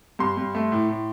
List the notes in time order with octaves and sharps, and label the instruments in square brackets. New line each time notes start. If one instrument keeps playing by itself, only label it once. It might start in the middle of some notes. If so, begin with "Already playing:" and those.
[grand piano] G2 C6
G2
A3
A2
A2